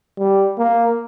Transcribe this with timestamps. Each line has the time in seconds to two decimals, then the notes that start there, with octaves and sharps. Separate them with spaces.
0.18 G3
0.58 A#3